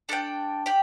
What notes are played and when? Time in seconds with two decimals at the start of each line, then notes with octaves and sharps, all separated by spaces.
0.09 D4 A4 D5 G5
0.66 G4 D5 G5